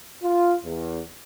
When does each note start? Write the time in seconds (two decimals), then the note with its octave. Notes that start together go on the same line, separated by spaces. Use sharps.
0.23 F4
0.64 E2